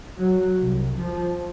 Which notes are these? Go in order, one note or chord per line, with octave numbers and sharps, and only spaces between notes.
F#3
C2 C3
F3